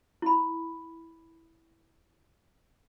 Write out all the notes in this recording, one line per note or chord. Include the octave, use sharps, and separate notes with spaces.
E4 B5